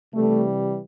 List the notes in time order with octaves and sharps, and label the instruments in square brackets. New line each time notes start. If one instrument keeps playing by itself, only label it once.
[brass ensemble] C3 E3 G3 A3